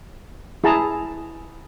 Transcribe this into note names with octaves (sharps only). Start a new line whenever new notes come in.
E4 G#4 A5 A#5